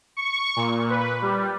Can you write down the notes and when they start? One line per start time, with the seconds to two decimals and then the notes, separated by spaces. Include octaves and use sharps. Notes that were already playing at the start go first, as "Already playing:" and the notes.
0.17 C#6
0.56 A#2
0.90 B4
1.22 G3